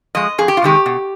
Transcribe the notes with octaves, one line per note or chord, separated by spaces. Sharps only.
F3 G#3 D#5
F2 G#4
G4
F4
C3 D#3 G#3 G4
B2